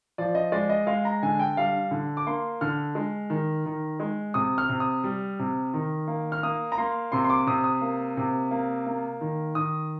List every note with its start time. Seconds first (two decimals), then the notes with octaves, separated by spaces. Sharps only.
0.18 F3 D5
0.35 D#5
0.52 G#3 D5
0.69 D#5
0.87 G#3 F5
1.05 A#5
1.23 D3 G#5
1.39 G5
1.57 G3 F5
1.91 D3
2.17 D6
2.27 A#3 C6
2.61 D3 F6
2.95 G#3
3.30 D#3
3.66 D#3
4.00 G#3
4.34 C3 D#6
4.58 F6
4.69 C3
4.80 D#6
5.04 G3
5.39 C3
5.74 D#3
6.08 A#3
6.32 F6
6.43 A#3 D#6
6.72 A#5
6.78 A#3 C6
7.12 C3 C6
7.24 C6
7.30 D6
7.47 C3 D#6
7.64 D#6
7.82 A#3
8.17 C3
8.51 A#3
8.87 A#3
9.21 D#3
9.55 D#3 D#6